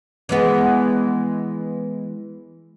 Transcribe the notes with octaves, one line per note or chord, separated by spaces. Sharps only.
E3 G#3 B3